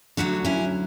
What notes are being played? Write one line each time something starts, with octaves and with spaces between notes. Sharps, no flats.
D2 D3 F#3 D4 F#4
C#4 E4